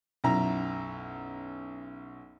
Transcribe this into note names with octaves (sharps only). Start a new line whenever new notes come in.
B1 F#2 E4 A#5